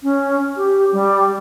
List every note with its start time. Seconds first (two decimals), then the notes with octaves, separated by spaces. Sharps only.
0.03 C#4
0.57 G4
0.92 G3